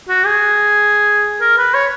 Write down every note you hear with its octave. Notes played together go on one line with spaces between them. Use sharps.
F#4
G#4
A#4
B4
C#5